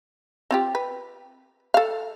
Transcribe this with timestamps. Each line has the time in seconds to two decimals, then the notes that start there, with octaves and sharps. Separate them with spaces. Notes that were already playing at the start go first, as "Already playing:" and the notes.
0.51 C4 F4 G4
0.75 B4
1.74 A4 F5